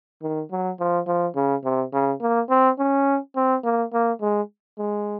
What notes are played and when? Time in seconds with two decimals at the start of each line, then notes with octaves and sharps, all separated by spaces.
0.22 D#3
0.52 F#3
0.80 F3
1.07 F3
1.36 C#3
1.64 C3
1.93 C#3
2.21 A#3
2.50 C4
2.79 C#4
3.36 C4
3.64 A#3
3.93 A#3
4.21 G#3
4.78 G#3